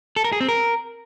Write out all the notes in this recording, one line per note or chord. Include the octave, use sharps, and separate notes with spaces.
A4
A#4
G#4
C4
A#4